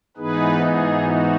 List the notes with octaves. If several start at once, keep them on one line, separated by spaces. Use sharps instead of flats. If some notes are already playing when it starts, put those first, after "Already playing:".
G#2 E3 B3 D#4 G#4 B4
G#4
F#4